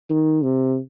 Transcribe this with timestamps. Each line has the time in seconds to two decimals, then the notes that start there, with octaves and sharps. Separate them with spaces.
0.10 D#3
0.43 C3